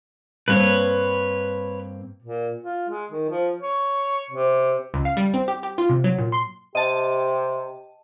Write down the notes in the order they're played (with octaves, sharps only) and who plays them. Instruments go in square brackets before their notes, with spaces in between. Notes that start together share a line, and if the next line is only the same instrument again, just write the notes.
[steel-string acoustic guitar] G2 A#3 C4 [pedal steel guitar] B4 C#5
[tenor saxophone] A#2
F4
G#3
D#3
F3
C#5
C3
[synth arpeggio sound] C#2
F5
G3
C4
G4
G4
F4
C3
F#3
A#2
C6
[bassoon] C3 [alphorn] G4 [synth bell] D#5 A5